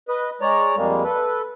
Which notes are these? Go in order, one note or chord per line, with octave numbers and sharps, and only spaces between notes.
B4 D#5
G#3 C#5 D5 A#5
F2 G3 G#3 A#3
A4 B4